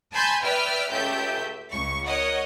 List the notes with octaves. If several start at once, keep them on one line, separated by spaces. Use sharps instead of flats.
G#5 A5 B5 C6 G6
B4 D5 E5 G5 F6
C#2 A3 G4 E5 G6
C#2 C#6
A#4 C#5 D#5 F#5